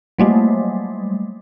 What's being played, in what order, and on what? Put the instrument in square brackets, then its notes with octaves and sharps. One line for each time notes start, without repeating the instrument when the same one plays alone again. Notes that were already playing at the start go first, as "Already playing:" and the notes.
[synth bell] F#3 G3 A3 A#3